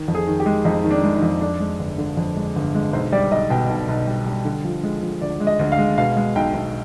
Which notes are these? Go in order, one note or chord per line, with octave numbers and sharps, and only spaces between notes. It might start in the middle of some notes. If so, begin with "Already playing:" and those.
Already playing: D#3
F2
G#4
D#3
G4
G#3
F2 D#4
D#3
D4
G#3
D#4
F2
F2 D4
G#3
G1
D3
F2
G#3
G1
G#3
B1 C5
G3 D5
B1 D#5
B2 G5
B1
B1
G3
G3
D3
F3
G#3
F3
D2 D5
G#3
D#5
D2
F5
G#3
B2 F5
G#3
B1 G5
B1